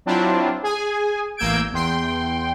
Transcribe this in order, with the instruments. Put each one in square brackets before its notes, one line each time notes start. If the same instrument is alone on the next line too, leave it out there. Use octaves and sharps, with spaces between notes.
[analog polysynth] F#3 C4 D4 E4 F4
G#4 G#5
A1 A#3 E6 G6 G#6 D7
E2 G5 C6